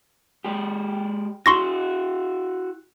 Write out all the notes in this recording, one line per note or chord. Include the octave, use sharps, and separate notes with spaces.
G#3 G4
E4 F#4 C6 C#6 A#6